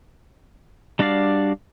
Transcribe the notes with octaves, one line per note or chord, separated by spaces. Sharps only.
G3 D4 F#4 D5 F5